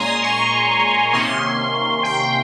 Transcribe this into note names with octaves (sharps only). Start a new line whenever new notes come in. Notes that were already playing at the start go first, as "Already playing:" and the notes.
Already playing: A#2 G#3 C#4 G#5 A#5 C6
C#6
C3 D#3 A#3 C#4 C6
G5